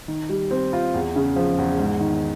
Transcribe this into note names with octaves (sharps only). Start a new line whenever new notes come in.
D#3
G3
C4
F4
E2
C#3
F3
E2
G#2
D#3